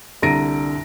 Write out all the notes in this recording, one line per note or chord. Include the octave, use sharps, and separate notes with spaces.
C2 D3 A#5 A#6 D7 D#7